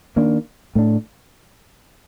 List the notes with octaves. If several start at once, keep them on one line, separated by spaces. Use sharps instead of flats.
D#3 A#3 D4
A2 A3 D4